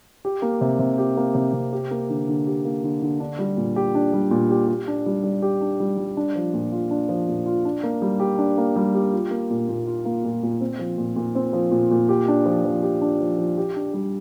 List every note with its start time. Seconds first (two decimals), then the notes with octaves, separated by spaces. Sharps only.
0.25 G4
0.42 A#3
0.61 C3
0.79 C3
0.98 G4
1.17 A#3
1.35 C3
1.53 C3
1.73 G4
1.91 A#3
2.10 D3
2.28 D3
2.47 G4
2.65 A#3
2.83 D3
3.02 D3
3.20 D4
3.39 G3
3.57 A#2
3.76 G4
3.95 D4
4.13 G3
4.31 A#2
4.50 G4
4.68 G4
4.88 D4
5.06 G3
5.24 G3
5.42 G4
5.61 D4
5.80 G3
5.98 G3
6.17 D4
6.35 F3
6.54 A#2
6.72 F4
6.91 D4
7.09 F3
7.28 A#2
7.46 F4
7.65 D4
7.83 A#3
8.02 G3
8.20 G4
8.38 D4
8.58 A#3
8.76 G3
8.95 G4
9.13 F4
9.31 A#3
9.50 A#2
9.69 A#2
9.86 F4
10.05 A#3
10.24 A#2
10.43 A#2
10.61 C4
10.79 F3
10.98 A#2
11.16 A#2
11.35 C4
11.53 F3
11.71 A#2
11.91 A#2
12.09 G4
12.28 D4
12.46 F3
12.65 F3
12.83 G4
13.02 D4
13.20 F3
13.38 F3
13.58 G4
13.76 D4
13.94 G3